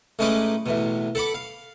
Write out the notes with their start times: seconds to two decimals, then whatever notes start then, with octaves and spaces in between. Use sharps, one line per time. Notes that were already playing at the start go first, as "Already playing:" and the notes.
0.19 A2 G#3 C#4 D#4 B4 D6
0.66 A1 E2 B2
1.15 A4 F#5 B5 D6
1.34 F5